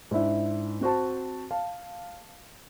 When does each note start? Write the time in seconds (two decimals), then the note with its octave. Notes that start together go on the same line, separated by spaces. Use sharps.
0.11 G#2 D4 E4 E5
0.81 C4 F#4 C5 A5
1.51 F5 A5